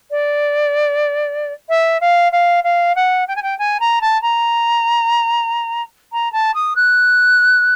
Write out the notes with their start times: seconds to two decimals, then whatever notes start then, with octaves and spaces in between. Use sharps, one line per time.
0.10 D5
1.69 E5
2.00 F5
2.32 F5
2.63 F5
2.95 F#5
3.27 G5
3.35 G#5
3.42 G5
3.58 G#5
3.80 A#5
4.01 A5
4.22 A#5
6.12 A#5
6.32 A5
6.54 D#6
6.75 F#6